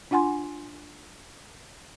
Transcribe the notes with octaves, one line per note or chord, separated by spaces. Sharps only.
D4 F4 F#5 G#5 C6